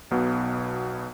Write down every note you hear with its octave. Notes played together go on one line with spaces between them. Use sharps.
B1 B2 B3